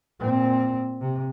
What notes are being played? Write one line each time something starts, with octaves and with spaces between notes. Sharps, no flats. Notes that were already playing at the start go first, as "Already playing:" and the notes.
A#2 C4
C3